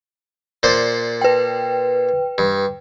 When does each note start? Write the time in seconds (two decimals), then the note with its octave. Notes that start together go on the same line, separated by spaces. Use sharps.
0.63 A#2 C5 D5
1.21 B4 G5
2.38 G2